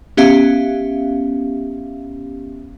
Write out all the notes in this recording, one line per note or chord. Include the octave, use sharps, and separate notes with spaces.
B3 C#4 G4 E5 F5